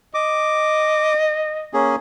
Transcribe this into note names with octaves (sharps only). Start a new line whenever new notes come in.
D#5 D6
A#3 C#4 G#4